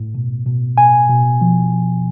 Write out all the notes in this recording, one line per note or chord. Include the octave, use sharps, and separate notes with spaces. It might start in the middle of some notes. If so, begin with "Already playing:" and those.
Already playing: A2
B2
B2
B2 G#5
B2
F3